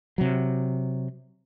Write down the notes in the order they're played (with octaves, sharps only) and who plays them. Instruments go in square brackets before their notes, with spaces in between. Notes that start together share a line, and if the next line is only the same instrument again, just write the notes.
[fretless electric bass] C3 F#3